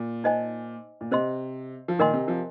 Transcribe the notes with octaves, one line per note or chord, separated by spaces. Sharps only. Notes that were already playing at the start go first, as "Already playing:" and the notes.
Already playing: A#2
D#4 C5 D#5 G#5
A#2
C3 C5 D#5 C6
F3
A#2 D#3 A#4 D#5 G#5 C6
C3
C3 F3